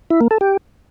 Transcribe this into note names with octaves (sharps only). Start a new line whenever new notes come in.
E4
A#3
A4
G4